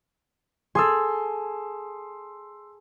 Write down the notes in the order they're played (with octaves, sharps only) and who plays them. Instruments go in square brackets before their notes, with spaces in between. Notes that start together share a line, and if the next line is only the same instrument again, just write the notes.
[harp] G#4 A4 [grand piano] C6 D#6 E6